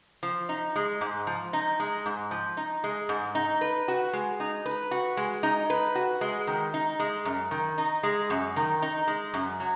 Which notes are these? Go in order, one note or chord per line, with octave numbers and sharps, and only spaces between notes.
F3
D#4
G#3
G#2
F3
D#4
G#3
G#2
F3
D#4
G#3
G#2
D#4
B4
F#4
G#3
D#4
B4
F#4
G#3
D#4
B4
F#4
G#3
D#3
D#4
G#3
F#2
D#3
D#4
G#3
F#2
D#3
D#4
G#3
F#2
F#3